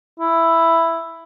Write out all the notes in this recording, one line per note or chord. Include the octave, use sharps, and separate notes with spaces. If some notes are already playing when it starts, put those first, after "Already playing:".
E4